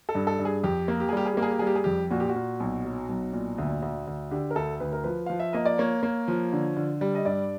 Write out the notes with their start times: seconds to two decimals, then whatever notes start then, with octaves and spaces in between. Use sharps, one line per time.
0.09 A4
0.15 G2
0.27 A4
0.39 G2
0.45 G#4
0.64 F2 G4
0.88 A#3
1.00 G4
1.09 G#4
1.12 G3 G4
1.25 G#4
1.34 A#3 G4
1.42 G#4
1.51 G4
1.59 G3 G#4
1.67 G4
1.75 G#4
1.84 F2 G4
2.11 A#2 F#4
2.20 G4
2.29 F#4
2.36 A#2
2.60 B1
2.85 F#3
3.09 B1
3.33 A#2
3.58 D2
3.82 D2
4.07 D2
4.31 D3 G4
4.51 A#4
4.56 D2 A4
4.80 D2 B4
4.93 A#4
5.04 F3 B4
5.26 F3 F5
5.40 E5
5.53 A#3 D#5
5.65 D5
5.78 A#3 C#5
6.03 A#3
6.28 F3
6.53 D3
6.77 D3
7.01 G3
7.15 D#5
7.25 G2 D5